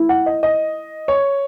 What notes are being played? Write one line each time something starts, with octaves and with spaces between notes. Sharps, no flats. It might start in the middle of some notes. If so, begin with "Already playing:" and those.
Already playing: E4
F#5
D#5
D#5
C#5